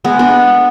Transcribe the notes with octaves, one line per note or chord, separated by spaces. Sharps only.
G#3 B3
B3 D4